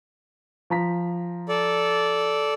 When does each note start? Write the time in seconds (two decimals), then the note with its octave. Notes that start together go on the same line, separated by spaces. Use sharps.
0.70 F3 A#5 B6
1.49 A4 D5